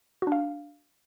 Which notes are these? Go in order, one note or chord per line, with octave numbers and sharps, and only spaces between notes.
D4 F#4 F5